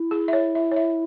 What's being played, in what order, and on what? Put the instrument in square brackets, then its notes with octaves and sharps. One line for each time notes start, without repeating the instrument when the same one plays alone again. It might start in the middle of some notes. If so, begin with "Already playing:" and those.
Already playing: [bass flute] E4
[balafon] G#4
E5
C#5
E5
C#5
E5